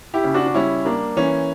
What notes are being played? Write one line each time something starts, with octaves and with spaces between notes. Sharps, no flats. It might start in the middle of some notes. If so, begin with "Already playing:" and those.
E4 G4
C#3
D4 F#4
D4
G3 C#4 E4
A#3 D4
E3 C#4